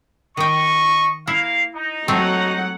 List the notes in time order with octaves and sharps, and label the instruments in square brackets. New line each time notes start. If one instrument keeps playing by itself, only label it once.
[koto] D#3 G5 [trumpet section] D#5 C#6
[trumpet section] A#3 F5 [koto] E4
[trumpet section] D#4
[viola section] F#3 F#5 [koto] A3 C4